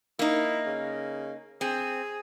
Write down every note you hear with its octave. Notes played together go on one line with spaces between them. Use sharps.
A#3 D#4 E4
C#3
C4 G#4